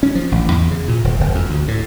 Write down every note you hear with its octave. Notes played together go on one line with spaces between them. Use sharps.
C#4
F3
A1
E2
C#3
A#2
D#1
F1
F2
D2
A2